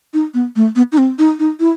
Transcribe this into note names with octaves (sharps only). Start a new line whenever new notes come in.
D#4
B3
A3
B3
D#4
C4
D#4
D#4
E4